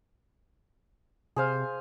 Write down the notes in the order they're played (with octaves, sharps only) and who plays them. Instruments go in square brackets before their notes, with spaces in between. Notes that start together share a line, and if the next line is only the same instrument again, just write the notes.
[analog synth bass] C3 [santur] G#4 C5 F5